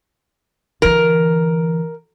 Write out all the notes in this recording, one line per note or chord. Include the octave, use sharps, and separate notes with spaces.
D3 E3 A#4